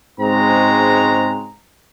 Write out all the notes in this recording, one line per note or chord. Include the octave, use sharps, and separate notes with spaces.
G#2 C#3 G#3 C4 F#4 A#5